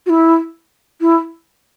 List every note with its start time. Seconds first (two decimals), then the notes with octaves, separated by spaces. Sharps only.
0.06 F#4
0.10 E4
1.01 E4